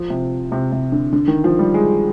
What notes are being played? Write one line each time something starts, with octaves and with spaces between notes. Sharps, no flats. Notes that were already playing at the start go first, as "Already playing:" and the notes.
Already playing: F3
C3
C3
C3
D3
D3
D#3
F3
G3
G#3